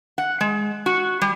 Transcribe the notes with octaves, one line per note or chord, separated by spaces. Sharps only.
F#5
G#3
F#4
G3